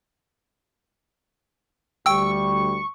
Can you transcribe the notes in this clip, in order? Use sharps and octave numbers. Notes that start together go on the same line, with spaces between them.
D2 G3 G5 C#6 E6